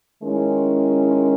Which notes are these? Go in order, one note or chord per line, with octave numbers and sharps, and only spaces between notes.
D#3 G#3 C#4 E4